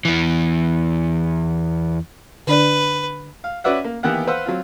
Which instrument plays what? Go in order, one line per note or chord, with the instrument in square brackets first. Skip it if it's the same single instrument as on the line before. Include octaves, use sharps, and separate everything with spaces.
[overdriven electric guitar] E2 E3
[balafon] D3 D4 D5 [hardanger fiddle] B4
[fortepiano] F5
C#4 F#4 B4 D5 E5 F#5
A#3
D#3 E3 A#3 B3 G4 F#5
B4 C5 F5 F#5 E6
F#3 C4 F4